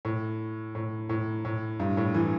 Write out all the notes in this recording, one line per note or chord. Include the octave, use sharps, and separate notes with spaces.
A2
A2
A2
A2
G2
A2
E3